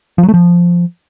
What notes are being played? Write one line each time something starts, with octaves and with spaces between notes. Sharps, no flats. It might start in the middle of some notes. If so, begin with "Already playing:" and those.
F3
F#3
A3
F3